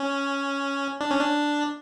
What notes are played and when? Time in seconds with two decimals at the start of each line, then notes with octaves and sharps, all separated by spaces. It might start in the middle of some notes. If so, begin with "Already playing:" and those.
Already playing: C#4
1.01 D4
1.10 C#4
1.20 D4